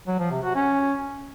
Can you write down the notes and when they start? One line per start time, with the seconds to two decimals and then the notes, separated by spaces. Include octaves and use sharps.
0.07 F#3
0.19 F3
0.31 C3
0.43 F#4
0.55 C#4